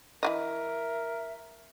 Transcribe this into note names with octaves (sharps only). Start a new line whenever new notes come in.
E3 A3 A#4 D#5 E5